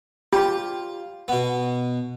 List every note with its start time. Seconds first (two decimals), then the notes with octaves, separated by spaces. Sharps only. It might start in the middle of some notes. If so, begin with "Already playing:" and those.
0.33 F4 G4
1.28 B2 B3